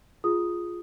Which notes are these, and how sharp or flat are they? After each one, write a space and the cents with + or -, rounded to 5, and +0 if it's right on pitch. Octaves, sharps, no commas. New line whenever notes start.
F4 +0 G#4 +0 D#6 +0